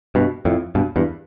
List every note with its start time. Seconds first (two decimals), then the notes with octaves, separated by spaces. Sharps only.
0.15 G2 B2
0.45 F2 A2
0.75 G2 B2
0.96 E2 G2